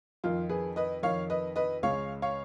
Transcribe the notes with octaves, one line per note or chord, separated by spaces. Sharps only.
F2 D#3 F4
G#4 B4
B4 D#5
F2 D#3 C#5 F5
B4 D#5
B4 D#5
C#2 C#3 C#5 F5
C#5 F5